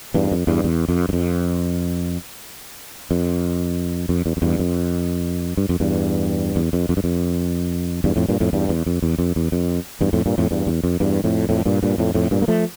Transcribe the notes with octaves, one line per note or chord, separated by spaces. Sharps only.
E2 G2
F2
E2 G2
E2
F2
G2
F2
F2
F2
E2
F2
E2 G2
F2
G2
F2
E2 G2
E2
F2
F2
G2
F2
E2 G2
F2 A2
G2 A#2
F2 A2
E2 G2
E2
F2
E2
F2
E2
F2
E2 G2
F2 A2
G2 A#2
F2 A2
E2 G2
E2
F2
E2 G2
F2 A2
F2 A2
G2 A#2
G2 A#2
F2 A2
F2 A2
G2 A#2
A#3
F3 A3